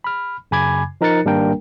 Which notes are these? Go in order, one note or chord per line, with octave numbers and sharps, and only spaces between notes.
B5 F6
F#2 C#3 G#5 B5 D6 G#6
F3 D#4 A#4 F#6 A6 C#7
G#1 G3 A#3 D4 A#4 G5